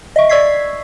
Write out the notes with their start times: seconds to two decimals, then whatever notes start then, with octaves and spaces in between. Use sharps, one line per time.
0.16 D#5 E5 C#6
0.29 D5 C#6 E6 G#6 B6 C7